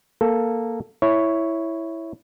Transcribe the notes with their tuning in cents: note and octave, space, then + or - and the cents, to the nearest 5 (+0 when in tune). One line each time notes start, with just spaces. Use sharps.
A#3 +0 A4 +0
E4 +0 C#5 +0